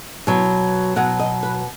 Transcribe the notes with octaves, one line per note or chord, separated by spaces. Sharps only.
B2 F#3
B2 F#3 F#5
D#5
B4